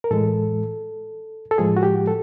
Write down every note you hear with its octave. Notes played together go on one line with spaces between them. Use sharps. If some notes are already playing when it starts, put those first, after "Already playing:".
A#4
A2 E3 G#3 A4
A4
A2 F3 G#3 G#4
F#4
G4
A4